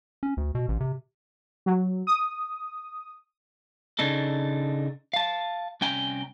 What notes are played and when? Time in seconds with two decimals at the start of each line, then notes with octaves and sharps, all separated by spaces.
0.23 C#4
0.37 D2
0.55 B2
0.68 A1
0.80 C3
1.66 F#3
2.07 D#6
3.99 C#3 D4 D#4 A4
5.13 F5 A5
5.81 C2 C#4 G5 G#5 A#5